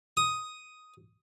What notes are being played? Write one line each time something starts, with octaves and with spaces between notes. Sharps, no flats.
D#6